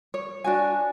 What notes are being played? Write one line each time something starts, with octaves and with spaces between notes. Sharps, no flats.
C#5
D4 F#4 G#5